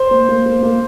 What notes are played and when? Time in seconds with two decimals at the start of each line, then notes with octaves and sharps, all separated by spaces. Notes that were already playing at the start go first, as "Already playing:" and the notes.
Already playing: C5
0.11 A#3
0.29 A#3
0.46 A#3
0.63 A#3